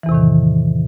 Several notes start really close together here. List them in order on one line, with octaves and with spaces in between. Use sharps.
E3 E2 C3 A2 D#3